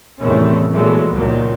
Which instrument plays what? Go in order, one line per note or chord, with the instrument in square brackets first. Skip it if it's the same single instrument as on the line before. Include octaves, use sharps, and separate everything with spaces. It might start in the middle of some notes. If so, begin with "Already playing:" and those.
[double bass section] E2 A2 C3 D#3 A3 C#4
A#2 E3 F#3 G#3 A3 B3
C#2 A#2 D#3 F3 F#3